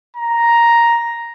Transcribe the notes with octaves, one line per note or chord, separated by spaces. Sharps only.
A#5